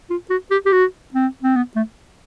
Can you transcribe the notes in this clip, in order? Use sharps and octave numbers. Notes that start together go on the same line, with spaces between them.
F4
F#4
G4
G4
F#4
C4
C4
B3
A3